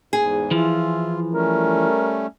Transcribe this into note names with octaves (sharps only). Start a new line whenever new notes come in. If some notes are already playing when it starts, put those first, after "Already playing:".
E2 G#2 G#4
E3 F3 E4 F4
G3 A3 C#4 A#4